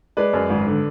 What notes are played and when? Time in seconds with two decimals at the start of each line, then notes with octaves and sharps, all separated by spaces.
0.17 G#3 B4 D5
0.33 F#2
0.50 G#1
0.66 D3